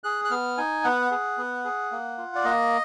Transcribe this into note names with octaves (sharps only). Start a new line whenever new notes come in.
G#4 F#6
F#6
B3 F6
D#4 G#5
B3 F#5
G#4
B3
G#4
A#3
F4
D5
A#3 D#5